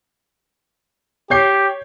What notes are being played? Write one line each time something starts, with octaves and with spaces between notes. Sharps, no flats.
G4 C#5 G6 C7